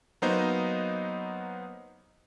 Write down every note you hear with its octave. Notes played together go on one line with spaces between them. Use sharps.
F#3 A#3 B3 D#4 C5 D#5